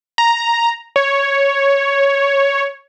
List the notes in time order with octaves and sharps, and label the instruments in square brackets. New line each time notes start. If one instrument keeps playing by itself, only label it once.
[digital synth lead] A#5
C#5